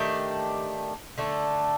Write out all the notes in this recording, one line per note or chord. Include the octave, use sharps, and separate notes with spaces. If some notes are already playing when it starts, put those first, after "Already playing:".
Already playing: D#3 A3 D4 G4
D3 A3 D4